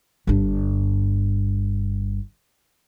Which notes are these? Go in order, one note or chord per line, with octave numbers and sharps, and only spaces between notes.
G1 G2